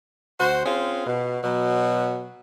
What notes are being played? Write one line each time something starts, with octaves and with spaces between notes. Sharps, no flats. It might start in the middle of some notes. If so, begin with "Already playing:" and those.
D2 F#4 C5
C4 C#4 F4 G#4
B2
B2 F#3